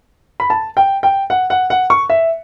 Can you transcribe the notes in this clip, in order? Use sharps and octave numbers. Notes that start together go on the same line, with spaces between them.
B5
A5
G5
G5
F#5
F#5
F#5
C#6
E5